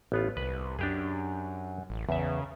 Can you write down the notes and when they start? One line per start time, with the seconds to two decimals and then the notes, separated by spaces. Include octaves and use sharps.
0.12 A1 B3 F4
0.37 C2 B4
0.79 F#2 D4 G4 G#4
1.90 A1
2.09 E2 C#3 E5